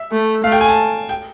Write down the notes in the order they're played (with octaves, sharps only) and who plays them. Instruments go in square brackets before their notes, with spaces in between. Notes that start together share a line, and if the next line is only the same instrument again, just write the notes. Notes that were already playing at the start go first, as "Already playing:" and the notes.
Already playing: [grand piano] E5
[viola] A3
[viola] A3 [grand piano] F5
[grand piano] G5
G#5
A5
G5